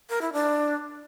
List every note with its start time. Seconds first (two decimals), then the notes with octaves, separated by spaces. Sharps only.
0.10 A#4
0.21 E4
0.33 D4